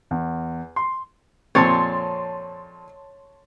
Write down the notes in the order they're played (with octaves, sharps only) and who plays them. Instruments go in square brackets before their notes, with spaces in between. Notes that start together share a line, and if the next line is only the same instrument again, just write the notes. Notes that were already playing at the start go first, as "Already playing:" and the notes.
[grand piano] E2
C6
[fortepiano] F2 A#2 C4 [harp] C#5 [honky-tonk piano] A5 C6 A6